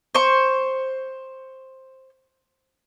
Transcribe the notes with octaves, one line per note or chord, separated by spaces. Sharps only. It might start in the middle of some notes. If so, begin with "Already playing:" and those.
C5 C#6